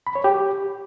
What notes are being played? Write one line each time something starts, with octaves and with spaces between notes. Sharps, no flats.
B5
C#5
G4